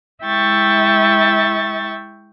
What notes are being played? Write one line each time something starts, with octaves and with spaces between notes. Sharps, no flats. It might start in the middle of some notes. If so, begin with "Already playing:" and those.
G#3 E4 E5 G5 C#6 A6